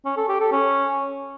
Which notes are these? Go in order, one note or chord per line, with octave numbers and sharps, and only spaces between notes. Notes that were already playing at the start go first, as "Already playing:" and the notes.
C#4
A4
G4
A4
C#4